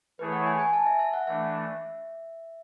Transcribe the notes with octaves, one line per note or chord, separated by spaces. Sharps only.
E3 A3 E4 G#4 B4 C#5
F#5
G#5
G#5
A5
E5
E5
F#5
E3 A3 D4 E5